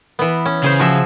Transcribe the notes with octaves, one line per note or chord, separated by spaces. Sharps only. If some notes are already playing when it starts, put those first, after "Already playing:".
E3 B3
C#4
C#3 G#4 C5
F3 F#4 E5